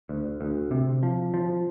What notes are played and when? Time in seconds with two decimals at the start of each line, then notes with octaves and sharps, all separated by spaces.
0.09 D2
0.41 D2
0.71 C3
1.03 F3
1.34 F3